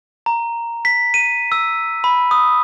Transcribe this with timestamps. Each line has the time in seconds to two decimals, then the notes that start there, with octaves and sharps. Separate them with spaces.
0.26 A#5
0.85 B6
1.14 D#7
1.52 E6
2.04 B5
2.31 D#6